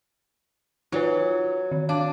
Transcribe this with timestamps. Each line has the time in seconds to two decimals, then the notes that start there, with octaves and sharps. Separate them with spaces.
0.92 F#3 D#4 F4 B4
1.71 D#3
1.89 D4 F5